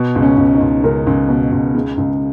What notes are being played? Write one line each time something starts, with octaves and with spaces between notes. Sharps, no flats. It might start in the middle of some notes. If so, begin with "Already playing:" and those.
Already playing: B2
C#2
C#4
C#2
D#4
C#2
C#2 A#4
C#2
B2
C#2
C#3
C#2